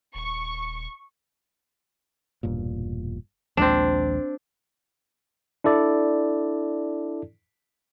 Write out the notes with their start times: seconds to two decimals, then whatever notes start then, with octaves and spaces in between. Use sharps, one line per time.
0.15 D#1 C#6
2.43 E1 G2 A#2
3.57 A#1 D#2 G#3 C4 D4
5.64 D4 E4 A4 D5